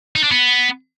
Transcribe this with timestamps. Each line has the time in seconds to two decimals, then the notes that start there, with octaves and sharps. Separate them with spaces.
0.16 D#4
0.24 D4
0.32 B3